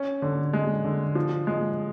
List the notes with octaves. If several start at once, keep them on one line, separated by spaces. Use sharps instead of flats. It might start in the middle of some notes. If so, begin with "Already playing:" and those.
Already playing: C#4
D3
G#3
D3
F3
G#3